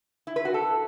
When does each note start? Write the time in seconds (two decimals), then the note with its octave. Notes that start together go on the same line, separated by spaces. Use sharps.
0.27 E4
0.36 B4
0.45 F#4
0.54 A4